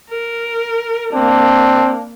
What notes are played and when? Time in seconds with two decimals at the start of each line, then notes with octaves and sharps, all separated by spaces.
0.10 A#4
1.14 A#3 C4 D4